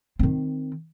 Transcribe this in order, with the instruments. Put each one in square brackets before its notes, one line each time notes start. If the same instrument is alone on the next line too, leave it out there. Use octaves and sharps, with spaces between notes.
[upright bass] D#3 C4